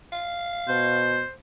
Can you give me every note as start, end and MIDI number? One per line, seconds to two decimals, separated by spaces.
0.12 1.01 77
0.68 1.24 47
0.68 1.31 72